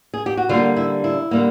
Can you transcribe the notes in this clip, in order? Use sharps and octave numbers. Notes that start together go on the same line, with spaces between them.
G#4
G4
F#4
D3 G3 A#3 F4
E4
E4
D3 G3 A#3